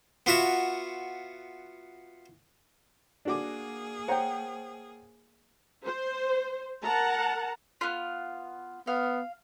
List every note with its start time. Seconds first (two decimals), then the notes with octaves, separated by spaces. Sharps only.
0.26 B3 F4 F#4 E5
3.25 A#3 D4 F#4 G#4 D6
4.08 C5 C#5 F#5 G5 A#5
5.86 C5
6.84 A#4 F#5 A5 A#5
7.81 B3 F4
8.87 B3 F5